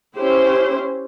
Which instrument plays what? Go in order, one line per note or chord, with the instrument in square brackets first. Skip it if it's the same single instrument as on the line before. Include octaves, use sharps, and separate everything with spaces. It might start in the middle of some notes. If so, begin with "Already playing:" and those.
[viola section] C#4 E4 G4 C5